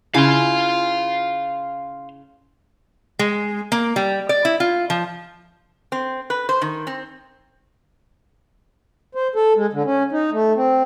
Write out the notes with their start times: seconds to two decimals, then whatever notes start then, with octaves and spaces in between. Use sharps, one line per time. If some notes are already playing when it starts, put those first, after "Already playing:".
0.14 C#3 E4 F5 G#5 C6
3.19 G#3
3.72 A#3
3.96 G3
4.29 D5
4.45 E4
4.60 F4
4.90 F3
5.92 C4
6.30 B4
6.49 C5
6.62 D#3
6.87 C4
9.15 C5
9.36 A4
9.56 G#3
9.73 D3
9.85 C#4
10.12 D#4
10.32 A3
10.56 C4